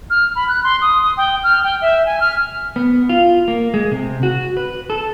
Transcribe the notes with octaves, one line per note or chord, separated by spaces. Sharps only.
F6
B5
F#6
C6
D#6
D#6
G5
F6
G5
E5
G#5
F6
B3
F4
A#3
G#3
C3
F#4
B4
A4